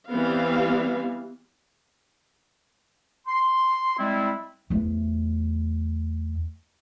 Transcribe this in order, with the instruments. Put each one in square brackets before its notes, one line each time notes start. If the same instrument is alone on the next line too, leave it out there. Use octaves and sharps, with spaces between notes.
[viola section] E3 G3 B3 C4 F5
[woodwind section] C6
G3 G#3 C4 E4
[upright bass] E2 A3